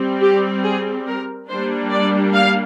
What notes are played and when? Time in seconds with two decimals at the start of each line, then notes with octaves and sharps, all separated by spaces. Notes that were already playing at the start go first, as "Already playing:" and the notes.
Already playing: G3 C4
0.21 G4
0.64 G#4
1.06 A#4
1.49 G3 A#3 D4 C5
1.91 D5
2.34 F5